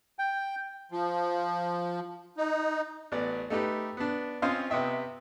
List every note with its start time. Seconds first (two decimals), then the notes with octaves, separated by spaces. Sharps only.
0.19 G5
0.92 F3
2.37 D#4
3.12 A1 B3 D5
3.50 A3 D#4 G4 B4
3.97 B3 D4
4.42 C4 C#4 F4 C5 D#5 F5
4.70 C3 B3 D#5 E5 G5